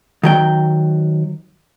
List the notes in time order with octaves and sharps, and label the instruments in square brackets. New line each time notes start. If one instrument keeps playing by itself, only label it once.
[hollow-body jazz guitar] D#3 F#3 G5